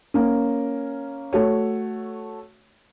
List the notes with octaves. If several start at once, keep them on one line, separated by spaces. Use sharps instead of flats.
A#3 C#4
A3 F#4 C#5